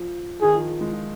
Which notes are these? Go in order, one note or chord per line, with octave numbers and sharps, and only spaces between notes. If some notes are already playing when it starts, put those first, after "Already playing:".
Already playing: F3
D#3 G#4
F3
G#3
F3